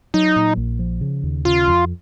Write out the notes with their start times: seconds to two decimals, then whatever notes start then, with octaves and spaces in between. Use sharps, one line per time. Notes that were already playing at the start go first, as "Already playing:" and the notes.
0.14 F#3 D#4
0.36 A#2
0.57 A#1
0.79 F3
1.01 C#3
1.23 D#2
1.45 C#3 F4
1.68 F2